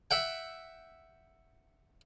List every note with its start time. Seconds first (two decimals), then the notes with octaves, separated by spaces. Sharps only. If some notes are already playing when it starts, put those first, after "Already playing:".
0.11 E5 F#5 G5